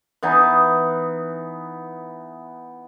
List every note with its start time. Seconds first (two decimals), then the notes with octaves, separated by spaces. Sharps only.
0.23 E3 B3 D#4